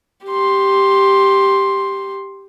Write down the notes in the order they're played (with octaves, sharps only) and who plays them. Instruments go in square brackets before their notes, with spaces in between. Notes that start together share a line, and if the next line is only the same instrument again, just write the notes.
[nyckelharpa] G4 C6